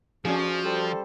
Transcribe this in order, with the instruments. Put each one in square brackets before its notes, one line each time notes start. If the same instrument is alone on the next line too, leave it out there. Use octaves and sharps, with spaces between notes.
[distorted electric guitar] F3 [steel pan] C#4 D4 G#4 [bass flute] F#4
[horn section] G3 A4 C5